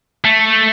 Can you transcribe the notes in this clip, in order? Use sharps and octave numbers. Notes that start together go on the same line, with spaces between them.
A3